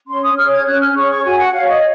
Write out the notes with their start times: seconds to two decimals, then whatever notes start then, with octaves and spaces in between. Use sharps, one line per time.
0.07 C#4 C6
0.22 D#6
0.36 G#4 C#5 F6
0.52 G#6
0.66 C#4 F#6
0.80 F6
0.95 G#4 C#5 C#6
1.10 C#6
1.24 F#4 G#5
1.38 F#5
1.53 C#5 F5
1.68 D#5